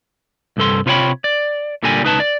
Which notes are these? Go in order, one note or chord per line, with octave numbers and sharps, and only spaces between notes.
C2 G2 A4 C6
C3 F4 B4 C#5 G5 B5
D5
A#2 D3 G3 A#4 G#5
C#2 D#4 B4 A5
D5